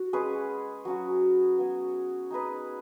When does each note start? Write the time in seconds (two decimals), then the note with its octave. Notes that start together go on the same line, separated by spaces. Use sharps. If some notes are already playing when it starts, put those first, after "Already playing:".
Already playing: F#4
0.13 G#3 C#4 G#4 B4
0.85 F#3 C#4 F#4
1.58 B3 F#4 C#5
2.30 D#4 G#4 B4 D#5